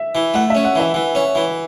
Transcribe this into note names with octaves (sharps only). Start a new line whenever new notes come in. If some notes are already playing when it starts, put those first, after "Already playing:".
Already playing: E5
E3
A3 F#5
E5
C#4
F#5
E3 E5
E3
C#4
E3